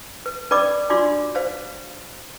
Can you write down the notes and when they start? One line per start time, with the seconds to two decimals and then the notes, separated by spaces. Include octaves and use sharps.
0.26 B4
0.51 C#4 B4 D5 D#5 B5 D6
0.90 D4 F4 F#4 D5 C6 D6
1.35 B4 C5 F5